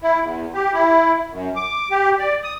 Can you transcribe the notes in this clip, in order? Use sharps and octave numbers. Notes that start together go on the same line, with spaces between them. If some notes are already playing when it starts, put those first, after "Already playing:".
E4
E2
G4
E4
F#2
D6
G4
D5
D#6